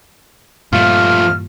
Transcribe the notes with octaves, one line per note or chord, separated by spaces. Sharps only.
G2 A#2 F3 A3 F4 F6